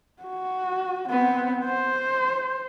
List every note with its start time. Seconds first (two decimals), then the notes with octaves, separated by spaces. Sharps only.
0.23 F#4
1.09 B3 C4
1.65 C5